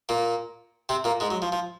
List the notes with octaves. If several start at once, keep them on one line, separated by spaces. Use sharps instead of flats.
A#2 A#3
C3 C4
A#2 A#3
G#2 G#3
F#3
F3
F3